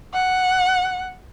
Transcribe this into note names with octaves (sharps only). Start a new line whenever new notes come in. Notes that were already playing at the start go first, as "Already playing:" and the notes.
F#5